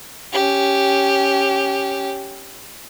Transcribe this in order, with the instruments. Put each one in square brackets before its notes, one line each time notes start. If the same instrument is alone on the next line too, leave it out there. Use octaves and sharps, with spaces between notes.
[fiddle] C#4 G4